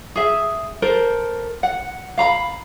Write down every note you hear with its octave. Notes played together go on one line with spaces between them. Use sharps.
G#4 E5
A4 A#4 C5
F#5
F5 A#5 B5